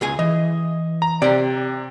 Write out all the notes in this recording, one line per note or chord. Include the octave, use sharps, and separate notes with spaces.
C#2 G#4 G#5
E3 D#5
A#5
C3 D5 G5